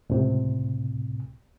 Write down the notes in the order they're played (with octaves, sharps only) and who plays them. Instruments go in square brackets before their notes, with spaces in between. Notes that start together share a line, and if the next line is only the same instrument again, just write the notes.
[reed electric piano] C#2 A2 C3